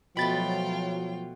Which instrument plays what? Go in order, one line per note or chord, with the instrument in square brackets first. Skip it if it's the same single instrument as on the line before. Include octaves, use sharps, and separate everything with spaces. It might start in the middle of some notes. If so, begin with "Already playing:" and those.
[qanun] B2 A3 [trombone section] F3 F#3 [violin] F4 G5 [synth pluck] B5 A6